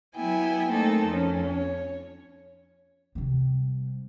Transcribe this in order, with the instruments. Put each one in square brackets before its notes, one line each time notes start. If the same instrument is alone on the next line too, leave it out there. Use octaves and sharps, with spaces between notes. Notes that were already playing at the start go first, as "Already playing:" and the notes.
[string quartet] F#3 B3 E4 G5 G#5
A3 A#3 C4 D#4 A4
F2 C#4
C#5
[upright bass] C3 G3